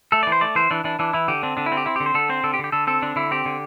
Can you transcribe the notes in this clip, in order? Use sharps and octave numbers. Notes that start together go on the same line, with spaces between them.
A3 A4
D5
E3
C5
A3 D5
E3 C5
E3 D4
E3 D4
E3 D4
E3 E4
D3 G4
C4 D4
D3 D4
E4
C4
G4
C4 E4
G4
D3
C5
D3 A4
C4 C5
D3 A4
G4
D3
G4
D3 A4
C4 A4
D3 D4
D3 E4
C4 G4
D3